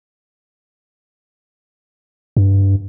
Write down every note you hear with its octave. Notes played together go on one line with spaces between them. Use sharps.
G2